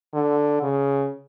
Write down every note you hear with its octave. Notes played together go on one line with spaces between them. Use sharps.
D3
C#3